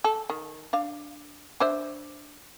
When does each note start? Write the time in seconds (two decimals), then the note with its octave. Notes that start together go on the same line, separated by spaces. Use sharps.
0.04 A4
0.30 D#3
0.73 D4 F5
1.60 D4 C5 E5